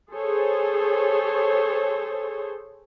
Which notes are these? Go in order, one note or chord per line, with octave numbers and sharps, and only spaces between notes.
G#4 A4 C5 C#5